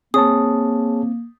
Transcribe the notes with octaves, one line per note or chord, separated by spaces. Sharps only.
A#3 C4 G#4 C#5 A5 D#6